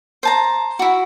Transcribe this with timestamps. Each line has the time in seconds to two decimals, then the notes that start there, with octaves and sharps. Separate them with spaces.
0.23 C5 A5 A#5
0.79 E4 F#4